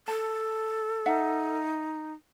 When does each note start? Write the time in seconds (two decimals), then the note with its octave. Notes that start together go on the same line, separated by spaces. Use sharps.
0.08 A4 A5
1.06 D#4 E5 F#5